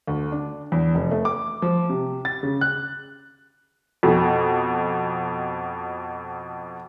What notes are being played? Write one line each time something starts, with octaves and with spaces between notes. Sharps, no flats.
D2
D4
E2
F1
A3
D6
F3
C3
A6
C#3
F#6
F2 B2